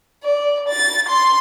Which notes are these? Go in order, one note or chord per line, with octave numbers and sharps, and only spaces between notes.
D5
A6
C6